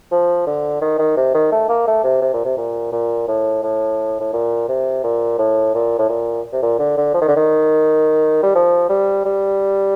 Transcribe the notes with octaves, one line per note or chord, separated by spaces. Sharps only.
F3
D3
D#3
D#3
C3
D#3
A3
A#3
A3
C3
C3
A#2
C3
A#2
A#2
A2
A2
A2
A#2
C3
A#2
A2
A#2
A2
A#2
C3
A#2
D3
D3
F3
D#3
D3
D#3
G3
F3
G3
G3